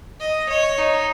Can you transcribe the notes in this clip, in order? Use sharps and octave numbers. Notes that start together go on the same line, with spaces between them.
D#5
C#5
D#4